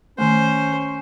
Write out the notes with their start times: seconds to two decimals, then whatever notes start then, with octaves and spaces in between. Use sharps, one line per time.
0.18 D#3 A3 C#4 C5